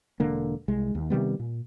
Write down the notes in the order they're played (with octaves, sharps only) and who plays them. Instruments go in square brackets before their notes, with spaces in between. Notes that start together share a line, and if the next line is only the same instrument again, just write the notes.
[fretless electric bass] E1 D3 A#3
C2 G#3
D#2
C3 D#3 G3 B3
A#2